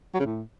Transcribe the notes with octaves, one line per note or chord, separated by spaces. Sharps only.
F#3
C#3
A2